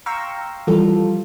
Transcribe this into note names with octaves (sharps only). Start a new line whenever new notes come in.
F5 G5 A#5 C6 C#6 E6
E3 F3 G3 F4 A4